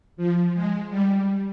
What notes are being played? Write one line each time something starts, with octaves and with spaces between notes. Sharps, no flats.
F3
G#3
G3